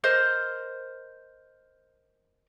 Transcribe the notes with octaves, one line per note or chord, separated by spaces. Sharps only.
A#4 C5 D#5